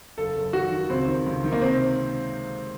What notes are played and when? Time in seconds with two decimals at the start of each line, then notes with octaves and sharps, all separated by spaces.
0.17 F#1 A4
0.36 F#1
0.53 D#3 F#4
0.72 D#3
0.90 C#2 C4
1.08 D#3
1.26 C#2
1.44 D#3
1.52 A#3
1.61 C3 C4